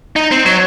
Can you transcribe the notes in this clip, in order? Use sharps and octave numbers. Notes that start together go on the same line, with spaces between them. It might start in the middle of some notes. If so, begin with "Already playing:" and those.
D#4
C4
F#3